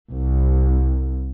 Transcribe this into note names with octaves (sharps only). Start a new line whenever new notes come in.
C2